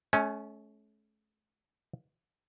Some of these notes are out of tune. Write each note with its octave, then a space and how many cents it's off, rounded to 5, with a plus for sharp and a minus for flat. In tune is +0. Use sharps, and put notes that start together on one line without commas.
A3 -40 C#4 +0